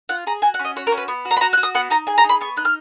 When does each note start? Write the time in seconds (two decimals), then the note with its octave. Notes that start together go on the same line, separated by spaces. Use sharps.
0.09 F4 F#5
0.27 G#4 A#5
0.42 F#4 G#5
0.54 F#5
0.59 C#4
0.65 D#5
0.76 F#4 C#5
0.87 A#4
0.92 C#4
0.98 B4
1.08 B3
1.25 F#4
1.31 A#5
1.37 B5
1.41 F#4 A#5
1.53 F#6
1.57 F#4
1.63 D#6
1.74 B3 F#5
1.90 D#4 A#5
2.07 G#4 G#5
2.18 A#5
2.24 D#4
2.29 B5
2.41 B3 C#6
2.57 D#4 F#6
2.65 F6